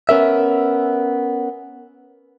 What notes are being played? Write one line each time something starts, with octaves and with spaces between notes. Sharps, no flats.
B3 C#4 A#4 E5